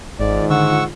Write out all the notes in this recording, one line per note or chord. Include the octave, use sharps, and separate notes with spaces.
G#1 G#2 D#3 F4 D5
D3 F#5 C#6 E6